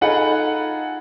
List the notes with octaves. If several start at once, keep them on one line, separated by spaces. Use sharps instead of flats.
D#4 F4 G#4 A4 F#5 B5